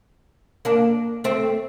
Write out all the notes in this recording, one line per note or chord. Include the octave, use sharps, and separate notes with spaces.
A#3 D4
A3 C4